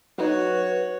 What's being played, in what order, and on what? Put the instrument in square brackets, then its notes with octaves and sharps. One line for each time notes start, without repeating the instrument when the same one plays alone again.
[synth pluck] F#3 D#4 [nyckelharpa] F#4 C#5 [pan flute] B4